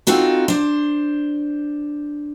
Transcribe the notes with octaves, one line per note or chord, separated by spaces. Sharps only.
C4 D#4 F4 F#4 A4
D4 C5